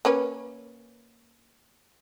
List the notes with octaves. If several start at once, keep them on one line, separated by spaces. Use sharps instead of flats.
A#3 C#4 B4